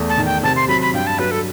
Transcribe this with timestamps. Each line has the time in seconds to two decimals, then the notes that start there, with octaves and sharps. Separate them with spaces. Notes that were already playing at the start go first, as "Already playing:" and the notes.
Already playing: E2 A3
0.09 A5
0.18 D#3
0.26 G5
0.43 C3 A5
0.56 C6
0.68 F#3 B5
0.82 B5
0.94 G2 G5
1.07 A5
1.19 F#3 B4
1.31 A4